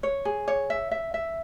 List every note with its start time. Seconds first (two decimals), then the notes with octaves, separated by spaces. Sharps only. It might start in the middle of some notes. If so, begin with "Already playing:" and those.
0.03 C#5
0.25 G#4
0.48 C#5
0.70 E5
0.91 E5
1.14 E5